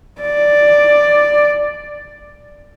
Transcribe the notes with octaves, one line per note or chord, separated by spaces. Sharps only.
D5